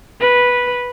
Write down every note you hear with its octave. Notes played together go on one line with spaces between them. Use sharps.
B4